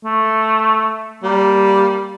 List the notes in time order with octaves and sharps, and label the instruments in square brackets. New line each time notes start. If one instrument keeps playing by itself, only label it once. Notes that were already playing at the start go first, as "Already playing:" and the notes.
[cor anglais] A3
[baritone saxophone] G3 [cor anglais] A#3